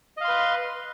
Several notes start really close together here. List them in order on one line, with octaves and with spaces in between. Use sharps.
D#5 F5 C6 B4